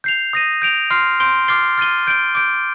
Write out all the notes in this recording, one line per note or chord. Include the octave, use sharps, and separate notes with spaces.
G6 C7 F7
D#6 A#6 D#7
G6 D7 F7
C6 F6 C7
C6 G6 D7 G7
D6 F6 A6 C7 G7
F6 A6 D#7 G7
G6 D7 G7
D6 G6 D7